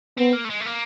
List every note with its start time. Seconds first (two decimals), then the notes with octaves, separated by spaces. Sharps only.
0.17 B3 C4
0.33 A#3
0.45 A3
0.50 G#3
0.60 A3
0.65 A#3